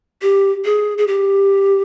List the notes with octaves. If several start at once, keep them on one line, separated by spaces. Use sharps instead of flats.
G4
G#4
G#4
G4